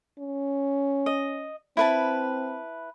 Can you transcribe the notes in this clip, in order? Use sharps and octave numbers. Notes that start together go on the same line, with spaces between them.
C#4
D#5
C4 E4 B4 A5